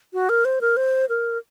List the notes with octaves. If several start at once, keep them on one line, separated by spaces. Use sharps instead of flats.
F#4
A#4
C5
A#4
C5
A#4